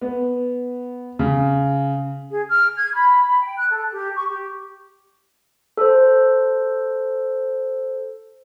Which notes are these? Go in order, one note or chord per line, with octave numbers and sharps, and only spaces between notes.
B3
C#3
G#4
F6
G#6
B5
G5
F#6
A4
G4
C#6
G4
A4 C5